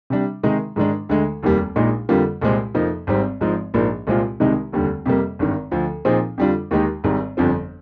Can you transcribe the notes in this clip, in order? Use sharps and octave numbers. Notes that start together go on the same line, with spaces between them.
C3 G3 D4
C3 D#3 G#3 D#4 G#4
G#2 D#3 G#3 D4
D2 D3 G#3
F1 D#2 D#3 G3 A#3
A#1 A#2 G#3 D#4
F2 D3 G3 A#3 F4
C2 A#2 G#3 C4
F2 C3 F3 A#3 D#4
G#1 G#2 G3 C4
G#1 G#2 F3 G#3
A#1 G#2 F3 A#3
C2 A#2 G#3 C4 F4
C2 C3 D#3 G#3 D#4
F1 D#2 D3 G3
F2 C3 G3 A#3
G#1 G2 D#3
D2 D3 F3
A#2 F3 C4 D#4 G#4
F2 D3 G3 D4 F4
D#2 D#3 G#3 D#4 G4
G#1 G#2 D#3 G3
G1 F2 D3 F3 C4